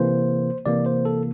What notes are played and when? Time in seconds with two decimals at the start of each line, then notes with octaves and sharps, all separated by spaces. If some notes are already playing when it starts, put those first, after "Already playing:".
Already playing: C3 E3 A#3 C5
0.66 C3 E3 A#3 D5
0.86 C5
1.05 A4